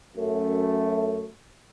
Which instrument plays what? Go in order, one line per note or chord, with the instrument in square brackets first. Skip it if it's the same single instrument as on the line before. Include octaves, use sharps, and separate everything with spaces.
[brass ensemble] F#2 A3